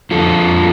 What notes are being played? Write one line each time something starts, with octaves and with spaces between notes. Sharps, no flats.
F2 D3 F3 F4 A4